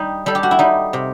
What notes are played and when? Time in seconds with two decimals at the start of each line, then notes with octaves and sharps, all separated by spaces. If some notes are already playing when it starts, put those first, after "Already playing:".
Already playing: G3 D#4
0.26 G3 A4
0.35 G4
0.43 F#4
0.51 E4
0.59 G3 D#4
0.93 C3